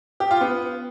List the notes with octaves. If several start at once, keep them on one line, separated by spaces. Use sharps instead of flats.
G4
F4
B3